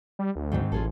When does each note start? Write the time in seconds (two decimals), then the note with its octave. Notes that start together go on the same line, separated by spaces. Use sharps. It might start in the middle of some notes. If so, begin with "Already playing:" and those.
0.19 G3
0.36 D2
0.52 G#2 D#3 C4
0.72 A1 F4 G#4 A4